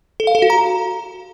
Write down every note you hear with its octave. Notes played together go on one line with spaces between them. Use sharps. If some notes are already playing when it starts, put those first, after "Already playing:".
A4
F5
A4
F#4
A#5